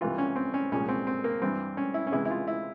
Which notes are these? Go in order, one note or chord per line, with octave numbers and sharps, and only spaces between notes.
C2 C3 E3 F4
C#4
C4
C#4
C2 A#2 F3 G#3 C#4
C4
C4
A#3
G2 E3 G3 C4
C#4
E4
C#4
C#2 C3 E3 G#3 E4
E4
F4
E4